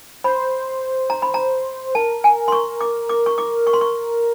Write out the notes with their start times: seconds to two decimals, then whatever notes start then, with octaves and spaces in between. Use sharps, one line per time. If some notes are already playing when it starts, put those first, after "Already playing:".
0.24 C5 B5
1.10 A#5
1.22 B5
1.34 A#5
1.95 A#4 A5
2.24 G#5
2.48 C6
2.52 C#6
2.81 D6
3.09 D6
3.26 C#6
3.38 D6
3.67 C#6
3.73 C6
3.81 C#6